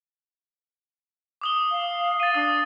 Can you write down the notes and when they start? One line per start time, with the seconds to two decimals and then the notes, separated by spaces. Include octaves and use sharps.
1.41 D6 D#6 G7
1.70 F5
2.20 A6 D#7
2.34 D4 D#6